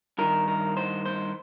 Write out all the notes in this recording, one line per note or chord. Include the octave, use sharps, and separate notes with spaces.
G2 D#3 A#4
A#4
C5
C5